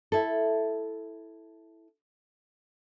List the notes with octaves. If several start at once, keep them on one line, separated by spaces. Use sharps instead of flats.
E4 A4